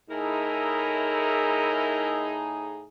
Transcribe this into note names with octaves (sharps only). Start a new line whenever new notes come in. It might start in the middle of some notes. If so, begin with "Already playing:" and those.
A2 D#4 E4 G#4 A#4